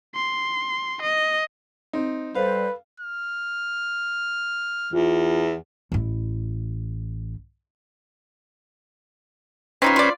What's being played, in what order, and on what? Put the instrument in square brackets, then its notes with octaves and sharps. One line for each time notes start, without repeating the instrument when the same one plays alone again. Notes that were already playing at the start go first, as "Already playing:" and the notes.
[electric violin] C6
D#5
[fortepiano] C4 D#4
[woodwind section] G3 A4 C5 [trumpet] B4 [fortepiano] F5
[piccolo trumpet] F6
[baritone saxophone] E2 [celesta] F4
[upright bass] A1 E4
[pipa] C4 D#4 F4 [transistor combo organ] C#4 B4 C5
[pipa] F4 D5